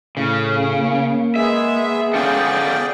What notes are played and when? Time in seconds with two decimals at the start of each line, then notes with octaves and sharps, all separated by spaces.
0.17 A2 C#3
0.77 A#3
1.36 G#3 B3 G#4 E5
2.14 B3 C#4 F4 G#4 A4 D5 G5